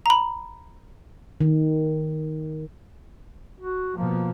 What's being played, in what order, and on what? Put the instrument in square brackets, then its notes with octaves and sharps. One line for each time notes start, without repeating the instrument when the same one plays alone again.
[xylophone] A#5 B5
[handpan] D#3
[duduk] F#4
[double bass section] B2 F3 [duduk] A#3